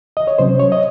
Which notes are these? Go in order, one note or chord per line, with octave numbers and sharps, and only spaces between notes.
D#5
C#5
C3 F#3 C#4 C5
C#5
D#5